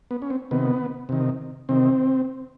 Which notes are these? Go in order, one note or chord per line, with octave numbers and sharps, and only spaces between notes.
B3
C#4
C4
C3 D#3 B3
C3 D#3
C3 D#3 C4